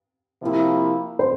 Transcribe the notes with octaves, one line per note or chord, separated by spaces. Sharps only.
C3 F3 A#3 E4
C5